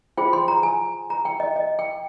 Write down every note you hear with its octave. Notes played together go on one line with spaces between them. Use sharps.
F4 G#4 C5 G5
C6
A#5
G#5
A#5
G5
D#5
D#5
G5